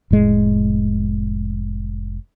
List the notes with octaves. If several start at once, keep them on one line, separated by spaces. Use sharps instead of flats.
F1 A2 G#3